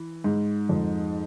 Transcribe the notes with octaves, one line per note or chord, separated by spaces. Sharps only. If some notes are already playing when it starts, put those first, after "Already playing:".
Already playing: E3
G#2
F2